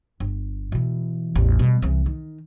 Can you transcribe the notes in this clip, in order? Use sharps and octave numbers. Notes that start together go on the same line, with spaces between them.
G1
B2 E3
A1 E2
B2 G3
C2 E3
D#3